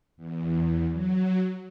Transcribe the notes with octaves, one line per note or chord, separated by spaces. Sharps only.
E2
F#3